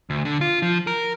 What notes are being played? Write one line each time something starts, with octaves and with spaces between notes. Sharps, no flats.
D2
D3
F4
F3
A#4